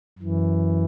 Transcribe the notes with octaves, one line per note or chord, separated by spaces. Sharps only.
F#2 E3